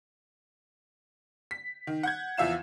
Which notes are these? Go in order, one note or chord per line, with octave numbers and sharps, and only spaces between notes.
B6
D#3
F#5 G6 G#6
E2 F3 E5 F5 E7